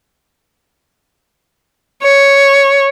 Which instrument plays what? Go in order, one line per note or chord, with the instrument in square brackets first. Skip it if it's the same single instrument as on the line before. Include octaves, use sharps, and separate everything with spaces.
[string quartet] C#5